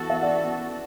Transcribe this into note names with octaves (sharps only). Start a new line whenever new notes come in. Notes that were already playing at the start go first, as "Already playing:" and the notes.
Already playing: E3 B3 F#4 A4
E5
D5 F#5